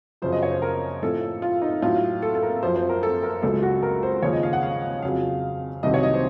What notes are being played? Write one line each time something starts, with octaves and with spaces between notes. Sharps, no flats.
F#2 C#3 F3 C5
D#5
C#5
C5
A#4
A2 F3 A4
F4
D#4
A2 F#3 F4
A4
A4
A#4
F#2 F3 C5
C5
A#4
A4
A#4
C#2 C#3 F#3 A4
F#4
A#4
C5
D#2 C#3 F3 C#5
D#5
F5
F#5
F5
F2 C#3 F#3 F5
C2 C3 D#3 F#3 D#5
C#5
D#5
C5